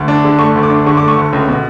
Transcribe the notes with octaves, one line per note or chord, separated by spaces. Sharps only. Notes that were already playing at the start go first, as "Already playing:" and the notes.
Already playing: D2
D4
D3
A3 C#6
D2
D6
D4
D3 C#6
A3 D6
C#6
D2
C#2
B2